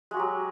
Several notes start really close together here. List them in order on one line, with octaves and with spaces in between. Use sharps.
G#3 F#4 G4 F#3